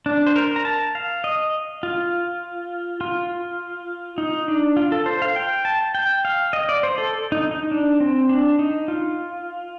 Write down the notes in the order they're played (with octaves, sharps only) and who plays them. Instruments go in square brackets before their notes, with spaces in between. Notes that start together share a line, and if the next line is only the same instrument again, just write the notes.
[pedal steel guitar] D4
C5
A#4
A#5
A5
F5
D#5
F4
F4
D#4
D4
F4
A4
C5
F5
G5
A5
G5
F5
D#5
D5
C5
A4
D#4
D#4
D4
C4
D4
D#4
F4